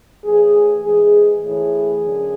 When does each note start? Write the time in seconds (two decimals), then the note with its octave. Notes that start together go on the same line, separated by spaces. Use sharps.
0.25 A2 E3 G#4
0.84 G#2 E3 G#4
1.43 A2 E3 G#4
2.04 F#2 D3